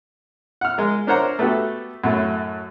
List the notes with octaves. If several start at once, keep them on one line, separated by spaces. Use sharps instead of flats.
F#5 F6
G#3 A#4
D4 A#4 C5 C#5 F#5 A#5
A3 B3 F#4 G4 A4
F#2 A2 A3